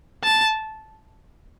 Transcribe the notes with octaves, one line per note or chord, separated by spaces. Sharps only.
A5